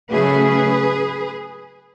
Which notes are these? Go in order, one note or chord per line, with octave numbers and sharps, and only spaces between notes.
C#3 F#3 A3 C#4 G#4 B4